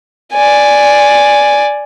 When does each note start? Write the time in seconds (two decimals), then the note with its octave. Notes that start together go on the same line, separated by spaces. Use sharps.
0.33 D5 G#5